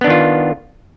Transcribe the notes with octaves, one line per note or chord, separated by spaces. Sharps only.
D#3 B3 D4 F4